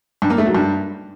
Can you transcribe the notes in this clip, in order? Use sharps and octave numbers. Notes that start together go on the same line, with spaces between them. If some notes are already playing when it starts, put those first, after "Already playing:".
G2
A#3
A3
F#3
G2